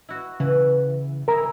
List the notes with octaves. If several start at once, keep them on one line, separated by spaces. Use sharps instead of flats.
E4 F#4
C#3 E3
E4 G#4 A#4 E5 A#5